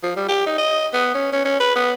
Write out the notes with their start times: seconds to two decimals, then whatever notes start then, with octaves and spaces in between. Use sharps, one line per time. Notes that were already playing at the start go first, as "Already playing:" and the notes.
0.03 F3
0.16 G3
0.28 G4
0.46 D#4
0.58 D#5
0.93 B3
1.15 C#4
1.32 C#4
1.45 C#4
1.60 B4
1.76 B3